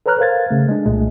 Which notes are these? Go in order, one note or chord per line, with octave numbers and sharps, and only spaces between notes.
A4 B4 C#5 A#5 F6 F#6
A#4 C5 F5 G#6 A6
C#3 A3
G#3 D4
C2 A#2 G#3 A3